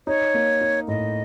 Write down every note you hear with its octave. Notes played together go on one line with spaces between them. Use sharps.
D#4 C#5
A#3
D#4
A2 D#5